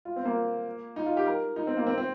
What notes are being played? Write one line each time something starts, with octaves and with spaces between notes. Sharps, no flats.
F4
C4
A#3
D#4
F4
G4
A#4
D#4
C4
A#3
C4
C4